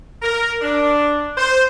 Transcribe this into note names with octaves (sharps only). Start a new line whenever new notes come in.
A#4
D4
C5